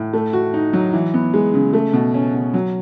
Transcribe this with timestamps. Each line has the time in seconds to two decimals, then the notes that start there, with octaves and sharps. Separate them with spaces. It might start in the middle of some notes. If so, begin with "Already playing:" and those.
Already playing: A2
0.13 A3
0.33 F#4
0.54 D#4
0.73 F#3
0.93 E3
1.14 B3
1.34 G#3
1.54 C#3
1.73 A3
1.93 B2
2.14 C#4
2.34 B2
2.54 F#3